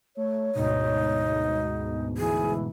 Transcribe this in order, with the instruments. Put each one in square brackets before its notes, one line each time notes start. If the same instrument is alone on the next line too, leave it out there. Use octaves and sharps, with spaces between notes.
[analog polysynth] A3 [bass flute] C#5
[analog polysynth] D2 G#2 B2 [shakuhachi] D#4
[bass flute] E3 [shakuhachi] G#4